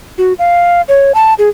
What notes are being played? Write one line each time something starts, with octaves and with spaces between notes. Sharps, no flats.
F#4
F5
C#5
A5
G#4